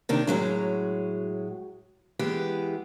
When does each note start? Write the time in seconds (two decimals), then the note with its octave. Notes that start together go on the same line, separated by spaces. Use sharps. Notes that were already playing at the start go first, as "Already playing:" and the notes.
0.09 C3 D#3 D4
0.27 A2 F#3 G#3 C#4
2.19 E3 G#3 B3 G4